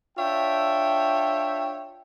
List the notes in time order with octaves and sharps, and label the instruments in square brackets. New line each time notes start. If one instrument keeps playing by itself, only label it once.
[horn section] D4 F4 C#5 E5 G5